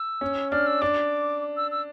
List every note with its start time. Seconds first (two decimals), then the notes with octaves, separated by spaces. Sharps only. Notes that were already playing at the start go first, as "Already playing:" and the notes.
Already playing: E6
0.21 C#4
0.51 D4 F6
0.67 E6
0.81 D4 D6
1.57 E6
1.71 E6